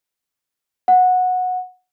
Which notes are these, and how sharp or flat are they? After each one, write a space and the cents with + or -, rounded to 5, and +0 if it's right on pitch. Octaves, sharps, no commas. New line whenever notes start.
F#5 -15